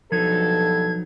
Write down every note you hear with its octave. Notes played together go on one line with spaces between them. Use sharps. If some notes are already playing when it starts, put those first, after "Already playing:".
G2 B2 F3 F#3 D#4 A4 G#6